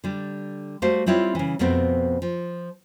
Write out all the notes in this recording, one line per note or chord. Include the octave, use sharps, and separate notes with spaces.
D3 G3
G3 A3 F#4 C5 F5
G3 C4 E4 F4 C#5
C#3 E3
F2 B2 A3 B3 C4
F3